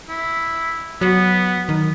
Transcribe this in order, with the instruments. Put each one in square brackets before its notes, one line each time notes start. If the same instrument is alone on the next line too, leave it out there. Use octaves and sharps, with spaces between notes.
[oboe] E4
[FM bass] F#3 [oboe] B3
[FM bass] D#3